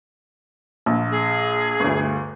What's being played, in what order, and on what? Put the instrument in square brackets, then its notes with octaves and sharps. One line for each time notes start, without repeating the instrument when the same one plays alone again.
[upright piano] A#1
[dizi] G#4
[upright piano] G1 D2